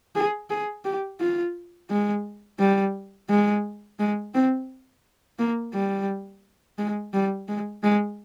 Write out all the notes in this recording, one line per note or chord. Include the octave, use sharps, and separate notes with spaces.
G#4
G#4
G4
F4
G#3
G3
G#3
G#3
C4
A#3
G3
G#3
G3
G#3
G#3